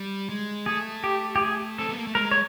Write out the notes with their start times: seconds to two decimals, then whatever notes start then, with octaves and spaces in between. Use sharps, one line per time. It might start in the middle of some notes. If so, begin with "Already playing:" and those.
Already playing: G3
0.29 G#3
0.66 A3 G#4
1.04 G4
1.36 G4
1.41 G#4
1.78 C4 A4
1.89 B3
1.97 A#3
2.07 A3
2.15 G#3 A#4
2.31 C#5